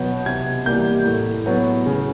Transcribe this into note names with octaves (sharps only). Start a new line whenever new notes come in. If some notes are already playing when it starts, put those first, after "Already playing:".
Already playing: B2 F#3 B3 G6
C3 G#6
E3 G3 A#3 G6
A2
F#3 B3
C#3